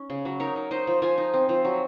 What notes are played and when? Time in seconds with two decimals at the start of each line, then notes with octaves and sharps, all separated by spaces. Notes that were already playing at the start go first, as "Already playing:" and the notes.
Already playing: C#4 D#4
0.10 C#3
0.25 F#3
0.40 D#4 A#4 C#5
0.56 D#4
0.71 D#4 C5 D#5
0.87 F3
1.02 F3 F5 G#5
1.18 D#4
1.34 C4
1.49 F3
1.65 F#3